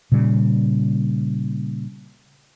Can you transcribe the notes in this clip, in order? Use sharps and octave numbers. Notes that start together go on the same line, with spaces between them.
A#2 C#3 G3